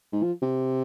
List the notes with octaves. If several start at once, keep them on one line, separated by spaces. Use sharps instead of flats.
G#2
F3
C3